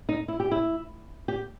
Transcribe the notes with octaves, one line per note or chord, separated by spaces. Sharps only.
D#4
E4
G4
E4
G4